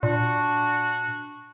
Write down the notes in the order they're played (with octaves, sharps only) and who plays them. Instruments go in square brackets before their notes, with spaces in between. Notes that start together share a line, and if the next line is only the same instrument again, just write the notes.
[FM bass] A#2 [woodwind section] D4 F#4